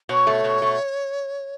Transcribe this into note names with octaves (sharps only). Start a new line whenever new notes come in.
B2 C#5
A3
B2
A3